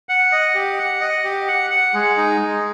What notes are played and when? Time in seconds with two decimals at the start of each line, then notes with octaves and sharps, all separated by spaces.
0.09 F#5
0.32 D#5
0.55 G4
0.78 F#5
1.01 D#5
1.24 G4
1.48 F#5
1.71 F#5
1.94 G#3
2.17 D#4
2.41 G#3